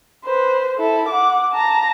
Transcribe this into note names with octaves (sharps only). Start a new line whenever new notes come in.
B4 C5
E4 A4
F#5 D6
A5 A#5